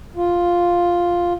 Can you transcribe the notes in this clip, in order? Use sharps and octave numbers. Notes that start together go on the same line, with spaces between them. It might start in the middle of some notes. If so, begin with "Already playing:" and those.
F4